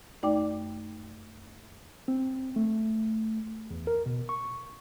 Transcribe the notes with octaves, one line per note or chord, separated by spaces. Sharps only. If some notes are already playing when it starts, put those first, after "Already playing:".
F#2 A3 D#4 D5 G5 D6
C4
A3
E2
A#4
B2
C#6